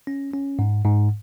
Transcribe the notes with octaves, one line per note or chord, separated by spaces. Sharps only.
C#4
C#4
G#2
G#2